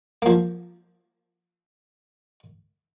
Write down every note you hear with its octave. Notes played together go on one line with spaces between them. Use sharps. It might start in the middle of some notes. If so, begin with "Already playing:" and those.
F3 A#3